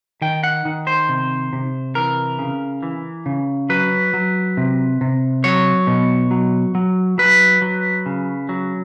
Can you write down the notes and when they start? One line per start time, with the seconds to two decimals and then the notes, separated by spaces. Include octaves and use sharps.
0.22 D#3 G5
0.43 F#5
0.65 D#3
0.87 C5
1.09 C3
1.53 C3
1.95 E3 A#4
2.39 C#3
2.83 E3
3.26 C#3
3.69 F#3 B4
4.13 F#3
4.57 C3
5.01 C3
5.44 F#3 C#5
5.87 B2
6.31 F#3
6.75 F#3
7.18 F#3 B4
7.62 F#3
8.06 C#3
8.49 F#3